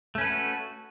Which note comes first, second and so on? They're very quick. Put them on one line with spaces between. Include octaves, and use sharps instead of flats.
A3 C#4 B4 A4 F#4